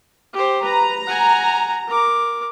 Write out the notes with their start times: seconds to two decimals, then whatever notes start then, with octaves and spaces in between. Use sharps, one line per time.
0.33 G4 C5
0.64 B4 A#5
1.07 F#5 G#5
1.87 A#4 D6